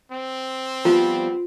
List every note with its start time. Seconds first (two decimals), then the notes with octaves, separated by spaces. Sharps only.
0.12 C4
0.85 F3 G3 B3 F4